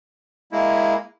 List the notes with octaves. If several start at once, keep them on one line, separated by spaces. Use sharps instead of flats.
G#3 A#3 E4